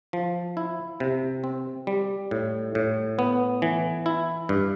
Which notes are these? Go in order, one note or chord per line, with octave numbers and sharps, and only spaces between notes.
F3
E4
C3
C4
G3
A2
A2
B3
E3
E4
G2